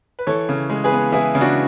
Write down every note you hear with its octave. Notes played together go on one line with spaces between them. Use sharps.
B4
E3 A4 C#5
C#3
G#3
G#4 B4
B3
E3 E4 G#4
C#3
D4 F#4